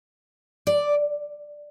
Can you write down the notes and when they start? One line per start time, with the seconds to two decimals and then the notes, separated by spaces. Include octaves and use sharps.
0.67 D5